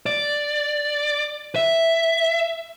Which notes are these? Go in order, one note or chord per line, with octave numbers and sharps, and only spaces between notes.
D5
E5